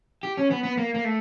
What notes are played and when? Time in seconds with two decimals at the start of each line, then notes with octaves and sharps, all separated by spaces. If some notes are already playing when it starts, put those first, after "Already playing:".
0.23 G4
0.37 C#4
0.51 B3
0.63 B3
0.77 A#3
0.94 A#3
1.04 A3